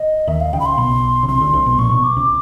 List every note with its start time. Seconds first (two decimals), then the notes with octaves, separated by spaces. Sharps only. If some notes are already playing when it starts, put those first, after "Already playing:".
Already playing: D#5
0.27 D#2 D#3 E5
0.40 F5
0.53 C#2 C#3 G5
0.60 B5
0.66 C6
0.78 B1 B2
1.23 C#3
1.28 C2 C3 C6
1.41 D2 D3
1.53 C2 C3
1.66 B1 B2
1.79 A#1 A#2 C#6
1.91 B1 B2
2.04 D6
2.16 C#2 C#3